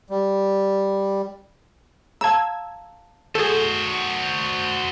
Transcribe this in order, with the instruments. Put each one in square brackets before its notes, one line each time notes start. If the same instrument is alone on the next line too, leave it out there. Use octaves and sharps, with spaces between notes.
[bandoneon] G3
[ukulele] F5 A5 A#5 [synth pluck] E6 G#6
[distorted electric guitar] F#4 C5 [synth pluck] G#4 A4